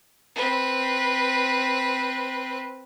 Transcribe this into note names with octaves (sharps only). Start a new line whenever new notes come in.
C4 B4